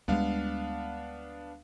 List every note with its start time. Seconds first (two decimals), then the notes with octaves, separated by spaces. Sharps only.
0.08 D2 G3 G#3 B3 D4 F5